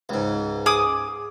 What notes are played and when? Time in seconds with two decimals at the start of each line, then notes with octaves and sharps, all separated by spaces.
0.09 C#2 G#2
0.66 G#4 D6 D#6